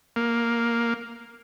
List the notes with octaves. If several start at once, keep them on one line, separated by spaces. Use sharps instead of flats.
A#3